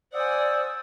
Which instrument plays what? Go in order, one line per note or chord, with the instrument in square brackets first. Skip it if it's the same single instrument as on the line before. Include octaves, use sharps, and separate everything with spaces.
[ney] C5 [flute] D5 [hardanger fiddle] F#5 G#5 [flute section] D#6 E6